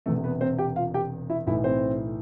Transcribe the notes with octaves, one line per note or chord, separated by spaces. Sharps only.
E1 E2 C3 A3 A4
B3 B4
C4 C5
G4 G5
F4 F5
G4 G5
E4 E5
B1 A2 E3 E4 E5
C4 C5